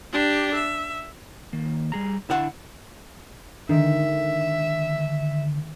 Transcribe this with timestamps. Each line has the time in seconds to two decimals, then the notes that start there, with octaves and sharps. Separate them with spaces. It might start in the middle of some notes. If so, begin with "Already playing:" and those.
0.12 D4 G4
0.55 E5
1.53 D#3 A#3
1.92 G3 G#4 A#5
2.30 D3 D4 E4 F5 F#5
3.69 D3 D#3 G#3 E5